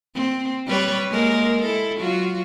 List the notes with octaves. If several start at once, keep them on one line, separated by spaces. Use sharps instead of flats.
C4
G3 B4 C#5
G#3 A#3 A#4
E4 A4
F#3 F4 F#4